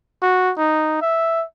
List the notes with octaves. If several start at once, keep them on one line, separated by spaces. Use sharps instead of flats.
F#4
D#4
E5